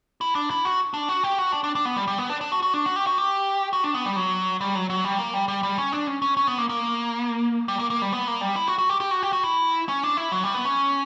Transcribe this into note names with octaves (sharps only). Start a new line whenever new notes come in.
E4
D4
E4
F#4
D4
F#4
G4
F#4
D4
D4
D4
B3
G3
G3
B3
D4
D4
F#4
F#4
D4
F#4
G4
F#4
G4
F#4
D4
B3
G3
F#3
G3
F#3
F#3
G3
A#3
G3
G3
G3
C#4
D4
C#4
C#4
C#4
B3
A#3
A#3
G3
A#3
A#3
G3
B3
A#3
G3
E4
F#4
F#4
G4
G4
F#4
G4
F#4
E4
C#4
D4
E4
F#3
G3
B3
C#4